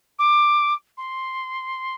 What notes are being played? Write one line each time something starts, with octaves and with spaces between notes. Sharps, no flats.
D6
C6